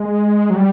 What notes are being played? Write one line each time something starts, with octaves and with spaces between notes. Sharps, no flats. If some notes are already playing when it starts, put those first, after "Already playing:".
Already playing: G#3
F#3
G3